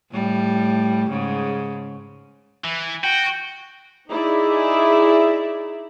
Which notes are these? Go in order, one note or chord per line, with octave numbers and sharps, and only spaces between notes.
A2 G3
G#2 C#3
E3
F#4 G5
D#4 E4 G#4 D5 E5